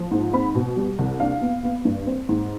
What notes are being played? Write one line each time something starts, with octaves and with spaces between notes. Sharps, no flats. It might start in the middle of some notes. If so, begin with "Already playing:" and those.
Already playing: F3
G#2
C4 B5
B2
G3
C2
D4 F5
B3
B3
G2
C4
G#2